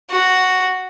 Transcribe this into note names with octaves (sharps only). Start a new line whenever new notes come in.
F#4